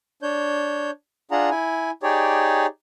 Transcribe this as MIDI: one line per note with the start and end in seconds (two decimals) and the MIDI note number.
0.22 0.91 62
0.22 0.91 73
0.22 0.91 91
1.31 1.50 62
1.31 1.50 65
1.31 1.50 68
1.31 1.50 78
1.31 1.50 82
1.50 1.91 64
1.50 1.91 80
2.03 2.66 63
2.03 2.66 67
2.03 2.66 68
2.03 2.66 73
2.03 2.66 74